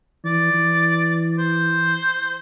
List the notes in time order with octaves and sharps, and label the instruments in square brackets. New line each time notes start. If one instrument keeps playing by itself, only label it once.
[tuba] E3 [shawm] D5
[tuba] E3
[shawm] C5